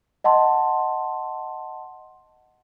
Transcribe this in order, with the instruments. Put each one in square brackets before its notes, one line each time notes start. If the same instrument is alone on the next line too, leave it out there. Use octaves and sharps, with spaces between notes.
[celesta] D#5 F#5 A5 C6